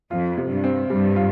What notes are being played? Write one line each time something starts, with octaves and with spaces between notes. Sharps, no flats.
F2 F4
C3
G2
C4
G2 G3
F4